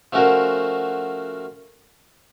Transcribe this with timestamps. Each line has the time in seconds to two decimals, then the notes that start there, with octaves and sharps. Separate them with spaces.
0.13 F3 A3 C#4 F#4 A#4 C5